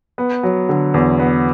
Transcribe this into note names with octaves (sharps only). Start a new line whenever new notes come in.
B3
F#3
D3
E2
B3